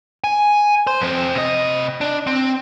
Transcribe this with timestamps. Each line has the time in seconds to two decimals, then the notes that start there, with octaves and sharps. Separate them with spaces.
0.24 G#5
0.87 C5
1.00 F2 C4
1.35 C3 D#5
2.01 D4
2.27 C4